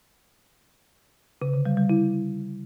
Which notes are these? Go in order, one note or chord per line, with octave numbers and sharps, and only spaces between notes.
C#3
D3
G3
G3
E4